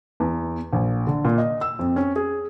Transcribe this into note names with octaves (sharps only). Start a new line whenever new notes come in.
E2
A#1
D3
A#2
D#5
E6
F2
C#4
G#4